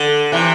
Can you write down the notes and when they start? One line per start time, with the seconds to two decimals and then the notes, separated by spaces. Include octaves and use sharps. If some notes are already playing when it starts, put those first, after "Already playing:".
Already playing: D3
0.32 C3 E3